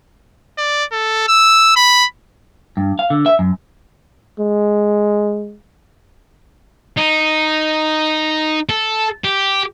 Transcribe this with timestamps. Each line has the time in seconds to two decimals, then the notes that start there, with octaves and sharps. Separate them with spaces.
0.58 D5
0.92 A4
1.28 E6
1.76 B5
2.77 G2
2.99 F5
3.10 D3
3.26 E5
3.39 F#2
4.40 G#3
6.97 D#4
8.69 A4
9.24 G4